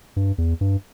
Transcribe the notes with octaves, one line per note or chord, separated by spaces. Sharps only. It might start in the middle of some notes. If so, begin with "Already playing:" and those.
G2
E2
G2